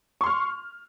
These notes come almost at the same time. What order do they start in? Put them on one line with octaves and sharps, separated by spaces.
C#6 C6 F6